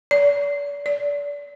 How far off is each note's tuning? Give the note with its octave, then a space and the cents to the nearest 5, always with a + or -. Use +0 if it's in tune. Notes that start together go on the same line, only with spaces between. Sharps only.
D5 -40
D5 -30